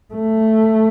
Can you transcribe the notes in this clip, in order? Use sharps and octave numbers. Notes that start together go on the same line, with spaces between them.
A3